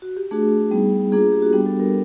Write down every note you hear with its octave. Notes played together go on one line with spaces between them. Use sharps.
F#4
G4
A3 D4 F#4 G#4
G3 B3 D#4
A#3 D4 F4 G#4
G#4
G4
F#4
G3 B3 D4 G4
A4
A#4